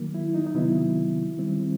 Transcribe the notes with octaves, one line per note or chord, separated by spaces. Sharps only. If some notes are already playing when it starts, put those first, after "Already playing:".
Already playing: D#3 F#3 A#3
E4
D#4
D#4
C3 D#3 F#3 B3 E4
D#3 G3 C4